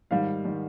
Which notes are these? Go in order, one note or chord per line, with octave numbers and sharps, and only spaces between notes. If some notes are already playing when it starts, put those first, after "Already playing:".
G#2 D#3 G3 F5
D#3 G3